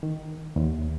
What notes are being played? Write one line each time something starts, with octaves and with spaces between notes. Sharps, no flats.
D#3
D#2